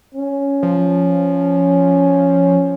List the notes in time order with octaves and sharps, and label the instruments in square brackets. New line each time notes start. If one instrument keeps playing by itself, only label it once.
[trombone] C#4
[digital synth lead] F3